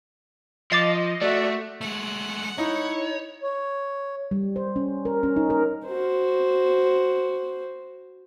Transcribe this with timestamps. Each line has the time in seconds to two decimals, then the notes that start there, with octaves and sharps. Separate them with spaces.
0.72 F3 D#5 D6 A6 C7
1.21 A3 F#4 D5 E5
1.81 G#3 A3 F#5
2.58 D#4 E4 C#5
3.43 C#5
4.31 G3
4.56 C5
4.76 C#4
5.05 A#4
5.23 C#4
5.36 D#4
5.50 A#4
5.87 F#4 C5